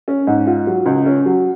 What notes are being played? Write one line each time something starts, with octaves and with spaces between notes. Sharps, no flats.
C#4
G#2
F4
F#3
C#2
C#4
F#3